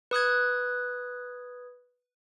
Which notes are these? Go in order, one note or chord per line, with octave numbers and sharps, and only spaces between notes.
B4 D#6 F#6 G#6